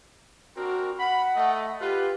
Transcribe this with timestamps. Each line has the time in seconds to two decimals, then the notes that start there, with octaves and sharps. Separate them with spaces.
0.57 C4 D4 F#4 A#4
0.98 F#5 B5
1.36 A3 D#5
1.81 F4 G4 B4